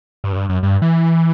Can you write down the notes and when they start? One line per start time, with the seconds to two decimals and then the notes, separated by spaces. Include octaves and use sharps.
0.24 G2
0.33 F#2
0.36 G2
0.49 F#2
0.63 G2
0.82 E3